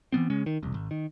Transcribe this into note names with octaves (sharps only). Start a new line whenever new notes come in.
E3 F#3 B3 C4
C#3 G#3 C#4
D#3
E1 C2
G#1
D#3